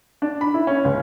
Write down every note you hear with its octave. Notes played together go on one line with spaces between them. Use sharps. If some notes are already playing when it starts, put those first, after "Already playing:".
D4
B5
E4
C#4
C#2